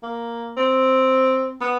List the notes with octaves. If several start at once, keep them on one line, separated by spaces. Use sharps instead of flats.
A#3
C4
B3